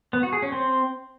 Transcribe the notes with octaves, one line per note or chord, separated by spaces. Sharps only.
B3
F#4
G#4
C#4
C4